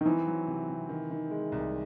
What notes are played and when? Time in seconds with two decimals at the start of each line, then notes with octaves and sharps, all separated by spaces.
0.01 D#3
0.06 E3 C4
0.27 F#3
0.47 C3
0.69 C3
0.89 D#3
1.10 D#3
1.31 G#3
1.52 C2